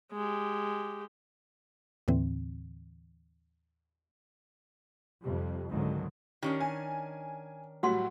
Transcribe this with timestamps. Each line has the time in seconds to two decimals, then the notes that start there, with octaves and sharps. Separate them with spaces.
0.13 G#3 G4
2.08 D#2 A2 D3 E3 C4
5.22 F2 C3 G3
5.68 G#1 C#2 G#2 D3 D#3 F#3
6.43 D#3 C#4 D4 G4
6.60 G#5
7.83 A2 F#3 G3 F#4 F#5 C6